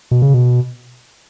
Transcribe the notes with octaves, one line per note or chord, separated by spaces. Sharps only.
B2
C#3
B2